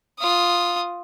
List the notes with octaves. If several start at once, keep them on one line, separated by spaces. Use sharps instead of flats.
F4 D#6